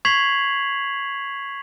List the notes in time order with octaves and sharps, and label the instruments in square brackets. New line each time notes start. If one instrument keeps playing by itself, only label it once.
[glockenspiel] C#6 G#6 B6 C7 F7 F#7